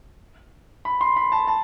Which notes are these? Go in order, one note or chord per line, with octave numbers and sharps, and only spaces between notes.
B5
C6
B5
A5
A5